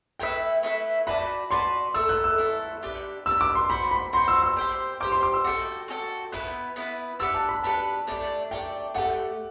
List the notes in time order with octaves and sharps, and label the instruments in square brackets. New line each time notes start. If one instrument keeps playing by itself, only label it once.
[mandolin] A3 E4 B4 E5 [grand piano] G5
[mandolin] A3 E4 B4 E5
[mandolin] F#4 B4 D5 A5 [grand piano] B5
[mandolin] F#4 B4 D5 A5 [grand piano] C6
[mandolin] A3 E4 A4 [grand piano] E6
[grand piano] F#6
E6
[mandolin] A3 E4 A4
D4 G4 B4
[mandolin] D4 G4 B4 [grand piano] E6
[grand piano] D6
C6
[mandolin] F#4 C5 G5 [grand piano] B5
[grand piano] B5
[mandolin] F#4 C5 G5 [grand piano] C6
[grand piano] E6
E6
[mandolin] G4 C5 G5
[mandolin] G4 C5 G5 [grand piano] D6
[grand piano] C6
D6
E6
[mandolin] F#4 A4 E5 G5
F#4 A4 E5 G5
[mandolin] B3 E4 B4 [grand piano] F#6
[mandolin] B3 E4 B4
[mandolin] D4 G4 B4 F#5 [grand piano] E6
[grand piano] A5
B5
[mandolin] D4 G4 B4 F#5 [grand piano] A5
[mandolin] A3 D4 G4 D5
[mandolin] A3 D4 G4 D5 [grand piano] G5
[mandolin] A3 D4 G4 [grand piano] F#5